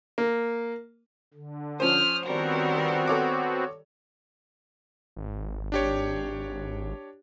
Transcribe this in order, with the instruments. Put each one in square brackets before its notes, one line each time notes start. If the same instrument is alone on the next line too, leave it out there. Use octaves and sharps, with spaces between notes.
[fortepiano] A#3
[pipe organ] D3
[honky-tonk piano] F3 C#4 C5 [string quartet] D#6 F6
[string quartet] D#3 G3 A#4 [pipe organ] B3 C4 F#4
[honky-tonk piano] A4 C#5 D6
[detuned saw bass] G#1
[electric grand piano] D4 G4 C#5